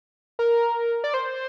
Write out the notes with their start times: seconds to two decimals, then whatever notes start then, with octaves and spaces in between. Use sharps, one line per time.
0.39 A#4
1.04 D5
1.14 C5